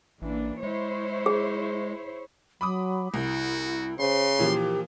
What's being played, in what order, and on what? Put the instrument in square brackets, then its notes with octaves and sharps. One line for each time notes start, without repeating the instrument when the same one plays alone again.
[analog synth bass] A1 [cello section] E3 A#3 D4
[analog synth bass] G#3 [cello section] E4 C5 C#5
[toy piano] G#4
[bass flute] F#3 [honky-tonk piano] B5 D6 D#6
[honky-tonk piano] C2 [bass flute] E4 [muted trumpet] F#4
[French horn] C#3 [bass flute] C5 [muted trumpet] C6
[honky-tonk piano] A#2 E3 F3 [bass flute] G4